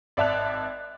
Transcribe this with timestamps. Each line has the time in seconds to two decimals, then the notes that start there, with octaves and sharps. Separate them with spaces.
0.17 G#1 D5 E5 A5 F#6 F7